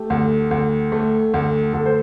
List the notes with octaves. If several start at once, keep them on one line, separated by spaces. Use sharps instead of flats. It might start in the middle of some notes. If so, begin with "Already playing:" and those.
Already playing: A3 G4
D2
D2
A3
D2
D2 A4
C5